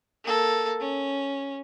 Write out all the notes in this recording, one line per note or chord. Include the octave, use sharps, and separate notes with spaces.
A#3 A4
C#4